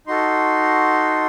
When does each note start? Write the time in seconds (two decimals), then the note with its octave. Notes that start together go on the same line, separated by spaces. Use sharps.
0.07 D#4 F#4 A4 C6